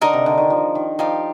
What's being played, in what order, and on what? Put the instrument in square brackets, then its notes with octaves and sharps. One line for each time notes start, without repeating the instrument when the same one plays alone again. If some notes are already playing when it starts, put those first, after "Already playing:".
[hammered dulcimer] D3 [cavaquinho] D#4 A#4 D#5
[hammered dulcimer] C3
D3
D#3
F3
D#3
[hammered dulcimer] F3 [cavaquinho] D#4 G4 D5 F5